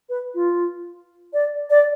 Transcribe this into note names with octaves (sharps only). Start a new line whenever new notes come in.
B4
F4
D5
D5